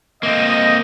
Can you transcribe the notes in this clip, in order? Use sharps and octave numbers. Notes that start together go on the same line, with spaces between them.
A#3 C4 D#5